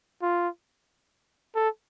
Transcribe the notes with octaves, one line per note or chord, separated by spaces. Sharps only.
F4
A4